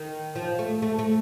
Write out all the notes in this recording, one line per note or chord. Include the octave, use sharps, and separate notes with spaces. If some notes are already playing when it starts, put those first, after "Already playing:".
Already playing: D#3
F3
A3
A3
A3